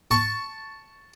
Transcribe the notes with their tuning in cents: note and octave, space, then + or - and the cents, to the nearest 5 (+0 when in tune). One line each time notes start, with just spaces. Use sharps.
A5 +0 C#6 +5